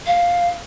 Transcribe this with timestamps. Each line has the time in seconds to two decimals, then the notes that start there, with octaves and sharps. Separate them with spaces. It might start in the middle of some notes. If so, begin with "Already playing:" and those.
0.07 F5